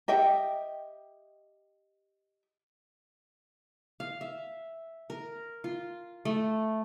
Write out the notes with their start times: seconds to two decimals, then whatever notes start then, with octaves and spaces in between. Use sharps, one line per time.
0.08 G4 D#5 E5 G5
4.00 F5
4.21 E5
5.10 A#4
5.64 F4
6.25 A3